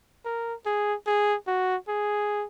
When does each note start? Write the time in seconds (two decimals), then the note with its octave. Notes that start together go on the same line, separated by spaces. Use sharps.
0.25 A#4
0.66 G#4
1.06 G#4
1.47 F#4
1.88 G#4